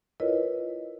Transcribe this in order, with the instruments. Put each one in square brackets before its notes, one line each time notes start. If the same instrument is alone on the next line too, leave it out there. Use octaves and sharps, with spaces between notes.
[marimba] E4 F4 A#4 B4 C#5 D#5